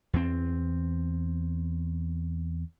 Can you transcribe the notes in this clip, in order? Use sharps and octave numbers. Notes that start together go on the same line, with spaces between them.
E2 C4